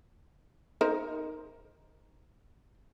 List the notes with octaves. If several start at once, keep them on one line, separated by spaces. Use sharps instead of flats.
D#4 A#4 C5